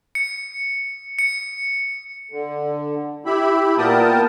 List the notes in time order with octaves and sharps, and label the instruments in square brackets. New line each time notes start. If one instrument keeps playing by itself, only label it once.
[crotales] C#7
C#7
[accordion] D3
E4 G4 E5 B5
A#2 B3 A#4 G5 A5 D#6